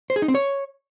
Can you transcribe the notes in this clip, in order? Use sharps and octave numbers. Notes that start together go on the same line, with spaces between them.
C5
G#4
D#4
C4
C#5